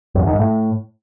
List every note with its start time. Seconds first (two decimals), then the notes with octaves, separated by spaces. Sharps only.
0.15 F#2
0.21 E2
0.27 D#3
0.33 G#2
0.39 A2